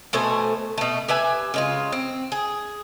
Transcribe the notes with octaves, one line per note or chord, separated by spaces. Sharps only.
B2 A3 C5 G#5
B2 A3
G4 B4 E5 G#5
C#3 G#3 F4
C4
G#4